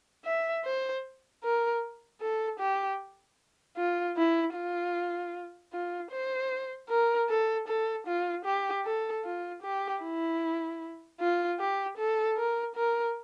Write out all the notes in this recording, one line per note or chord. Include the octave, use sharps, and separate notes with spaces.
E5
C5
A#4
A4
G4
F4
E4
F4
F4
C5
A#4
A4
A4
F4
G4
A4
F4
G4
E4
F4
G4
A4
A#4
A#4